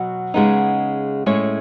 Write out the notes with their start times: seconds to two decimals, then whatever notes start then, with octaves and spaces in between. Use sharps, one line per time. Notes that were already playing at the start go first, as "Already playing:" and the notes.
Already playing: B2 F#3 B3 F#4
0.34 C#3 G#3 B3 D#4
1.26 A2 G#3 C#4 G#4 C#5